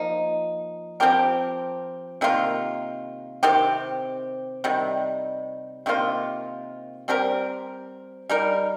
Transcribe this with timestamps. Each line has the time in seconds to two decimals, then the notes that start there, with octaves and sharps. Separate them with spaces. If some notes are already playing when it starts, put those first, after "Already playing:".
Already playing: F3 A#3 D#4
1.00 F3 C4 G4 A#4
2.21 C3 D#3 A#3 F4
3.43 C3 D#3 C4 G4
4.64 C3 D#3 G3
5.86 C3 D#3 A#3 F4
7.08 G3 C4 G4 A#4
8.29 G3 D#4 A#4